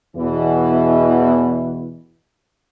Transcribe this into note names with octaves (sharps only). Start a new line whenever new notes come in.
E2 B2 E3